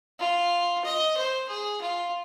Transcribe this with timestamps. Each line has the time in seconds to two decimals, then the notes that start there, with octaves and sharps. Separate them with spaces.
0.19 F4
0.84 D#5
1.17 C5
1.48 G#4
1.81 F4